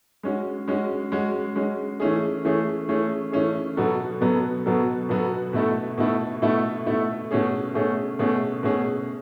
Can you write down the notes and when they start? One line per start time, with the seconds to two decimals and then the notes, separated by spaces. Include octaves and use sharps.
0.23 G#3 C#4 F#4
0.68 G#3 C#4 F#4
1.12 G#3 C#4 F#4
1.56 G#3 C#4 F#4
2.00 E3 A3 C#4 G#4
2.45 E3 A3 C#4 G#4
2.88 E3 A3 C#4 G#4
3.32 E3 A3 C#4 G#4
3.77 B2 F#3 B3 F#4 A4
4.21 B2 F#3 B3 F#4 A4
4.66 B2 F#3 B3 F#4 A4
5.09 B2 F#3 B3 F#4 A4
5.53 B2 A3 E4 A4
5.98 B2 A3 E4 A4
6.42 B2 A3 E4 A4
6.86 B2 A3 E4 A4
7.31 B2 A3 C#4 G#4
7.74 B2 A3 C#4 G#4
8.19 B2 A3 C#4 G#4
8.63 B2 A3 C#4 G#4